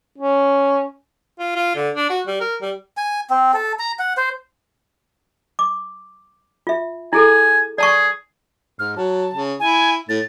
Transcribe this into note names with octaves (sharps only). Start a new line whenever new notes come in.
C#4
F4
F4
D3
D4
F#4
G3
A#4
G3
G#5
C4
A4
A#5
F#5
C5
D6
F4 E5
E4 G#4 A4 G#5
G#4 D5 A5 C#6
G#2 F6
F#3 A5
C#3
E4 G#5
A2 A6